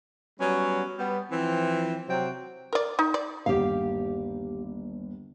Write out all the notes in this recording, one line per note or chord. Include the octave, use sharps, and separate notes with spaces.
F#3 G3 B3 C#4
G3 B3
E3 F3 C4
C3 F#3 C4 F#4 G5
A#4 D5
D#4
D5
G1 D#2 G4 F5